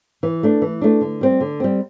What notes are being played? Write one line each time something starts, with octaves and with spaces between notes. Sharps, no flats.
E3
A3 D4
E3
A3 D4
D3
G3 C4
D3
G3 C4